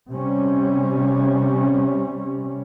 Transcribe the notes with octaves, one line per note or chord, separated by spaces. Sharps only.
C3 G3 C#4